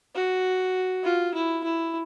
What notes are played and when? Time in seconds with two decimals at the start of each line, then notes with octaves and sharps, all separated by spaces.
0.15 F#4
1.04 F4
1.34 E4
1.64 E4